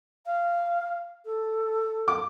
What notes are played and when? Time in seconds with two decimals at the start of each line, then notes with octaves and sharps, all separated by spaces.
0.26 F5
1.25 A4
2.08 D6